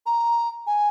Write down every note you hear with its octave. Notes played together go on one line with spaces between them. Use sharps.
A#5
G#5